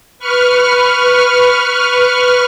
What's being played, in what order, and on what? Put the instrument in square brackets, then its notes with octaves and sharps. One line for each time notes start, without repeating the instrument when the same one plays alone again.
[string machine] B4 C#6 F6